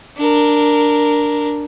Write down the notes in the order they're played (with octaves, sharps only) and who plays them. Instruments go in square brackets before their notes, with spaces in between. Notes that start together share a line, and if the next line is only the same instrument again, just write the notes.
[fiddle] D4 A#4